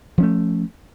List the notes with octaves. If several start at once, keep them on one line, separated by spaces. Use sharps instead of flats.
F3 A3 C#4